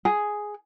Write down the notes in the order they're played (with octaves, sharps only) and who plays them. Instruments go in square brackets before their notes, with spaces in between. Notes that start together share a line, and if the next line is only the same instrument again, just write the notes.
[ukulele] G#4